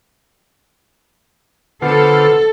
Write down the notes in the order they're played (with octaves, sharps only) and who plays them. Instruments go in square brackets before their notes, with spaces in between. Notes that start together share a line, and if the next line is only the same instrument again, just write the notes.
[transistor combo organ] D3 F4 C5 [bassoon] B3 [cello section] A4